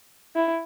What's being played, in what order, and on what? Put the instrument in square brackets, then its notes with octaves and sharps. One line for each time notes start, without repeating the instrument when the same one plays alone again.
[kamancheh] E4